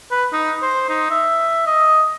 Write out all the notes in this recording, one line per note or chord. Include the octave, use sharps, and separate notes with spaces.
B4
D#4
C5
D#4
E5
D#5